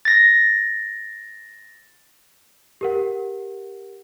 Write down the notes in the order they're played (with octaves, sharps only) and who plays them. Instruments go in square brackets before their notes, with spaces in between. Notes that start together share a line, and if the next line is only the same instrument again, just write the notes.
[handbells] A6 A#6
[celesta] G4 A#4 F#5